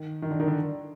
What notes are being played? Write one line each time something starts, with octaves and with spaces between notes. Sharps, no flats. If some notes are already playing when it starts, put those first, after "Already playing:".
Already playing: D#3
D#3
D3
D#3
D3